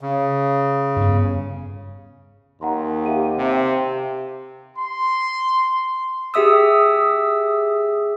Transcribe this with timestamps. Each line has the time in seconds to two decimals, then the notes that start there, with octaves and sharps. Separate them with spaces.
0.01 C#3
0.96 G2 B3
2.61 D#2 F#5 A#5 C6
3.06 G4 E5 F5 D#7
3.38 C3
4.77 C6
6.34 G4 G#4 E5 D#6 E6